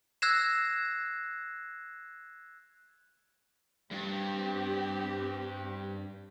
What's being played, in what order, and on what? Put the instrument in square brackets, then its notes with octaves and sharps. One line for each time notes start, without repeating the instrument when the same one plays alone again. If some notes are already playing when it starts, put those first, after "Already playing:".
[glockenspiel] E6 F#6 G#6 A#6 C7 E7
[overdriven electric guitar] G2 [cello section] C4 G4